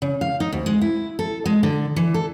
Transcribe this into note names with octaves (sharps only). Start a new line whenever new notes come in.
C#3
F5
D#4
D2
G#3
E4
A4
G#3
D3
E3
A4